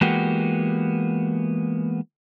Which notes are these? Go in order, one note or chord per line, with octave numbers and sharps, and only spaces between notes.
E3 G#3 A#3 B3 F#4 G4